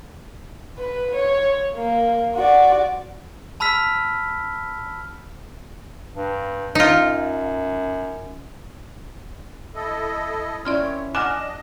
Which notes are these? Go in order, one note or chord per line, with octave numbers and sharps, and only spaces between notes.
B4
C#5
A#3
F#4 D5
A5 B5 E6 F6 B6
G2
F#2 D#4 F4
E4 A4 D#5
A#3 C4 C#4 E4 C#5 D5 C6 F6
D4 D#5 F#5 G#5 D6 F6 F#6 E7